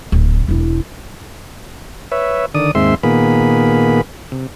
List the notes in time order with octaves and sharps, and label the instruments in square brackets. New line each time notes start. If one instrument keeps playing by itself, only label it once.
[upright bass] D1
E1 E4
[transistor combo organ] B4 C#5 E5
D3 D#3 D5 D#6
D#2 G#2 G#3 C4 E5 C6
A#2 D#3 A#3 B3 G#4 B5
C3